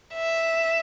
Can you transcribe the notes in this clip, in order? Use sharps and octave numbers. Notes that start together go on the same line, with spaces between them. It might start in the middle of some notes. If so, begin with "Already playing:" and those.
E5